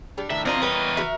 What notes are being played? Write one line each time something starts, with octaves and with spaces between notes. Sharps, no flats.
G3 D4
A2 D#3 E5
E2 C4 D4 F4 A#4 D#5 A#5
G3 B4 C#5 A#5
F#4 E5